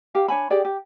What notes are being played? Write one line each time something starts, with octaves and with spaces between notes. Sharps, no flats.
G4 A#4 F5
D4 C#5 G#5 B5
G4 G#4 D5 G5
G4